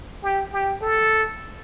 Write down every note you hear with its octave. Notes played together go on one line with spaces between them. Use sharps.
G4
G4
A4